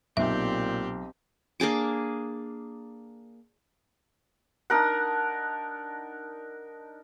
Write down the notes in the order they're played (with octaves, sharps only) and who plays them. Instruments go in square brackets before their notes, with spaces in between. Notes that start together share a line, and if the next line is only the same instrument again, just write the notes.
[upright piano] B1 [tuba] A#2 [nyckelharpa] C4 G4 [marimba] E5
[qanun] A#3 D4 G#4 D6
[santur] D4 D#4 A#4 F#5